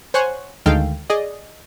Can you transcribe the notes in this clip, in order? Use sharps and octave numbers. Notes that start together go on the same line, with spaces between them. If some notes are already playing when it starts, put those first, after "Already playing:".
C5 C#5 F#5 G#5 C#6 F#6
D2 D#3 G#3 A4 F5 G5
G#4 D5 D#5